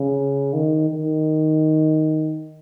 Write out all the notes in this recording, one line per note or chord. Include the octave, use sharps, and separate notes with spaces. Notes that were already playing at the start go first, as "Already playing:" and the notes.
Already playing: C#3
D#3
D#3